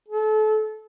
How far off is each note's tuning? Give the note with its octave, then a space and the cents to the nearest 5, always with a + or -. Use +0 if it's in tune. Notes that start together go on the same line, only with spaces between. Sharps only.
A4 -35